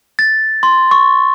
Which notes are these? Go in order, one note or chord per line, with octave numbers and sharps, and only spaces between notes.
A6
C6
C#6